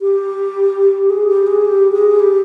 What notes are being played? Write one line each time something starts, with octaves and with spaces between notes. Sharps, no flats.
G4
G#4
G4
G#4
G4
G#4
G4